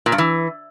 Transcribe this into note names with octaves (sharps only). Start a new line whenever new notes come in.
A#2
G2
E3